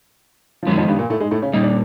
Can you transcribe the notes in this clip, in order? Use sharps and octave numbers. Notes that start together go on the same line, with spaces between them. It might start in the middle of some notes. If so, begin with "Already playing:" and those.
F3
F#2 D#3 F#3 G#3 B3
F2 F3
G2 G3
A#2 A#3
A2 A3
G#2 G#3
A2 A3
C#3 C#4
A#2 G3 A#3 D#4
D4